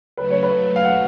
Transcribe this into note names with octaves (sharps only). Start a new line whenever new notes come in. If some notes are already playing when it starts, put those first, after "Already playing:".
C#3 F#3 A3 B4
C#5
B4
F5
F#5